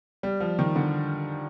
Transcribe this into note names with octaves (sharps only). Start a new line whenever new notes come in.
G3
F3
D#3
D3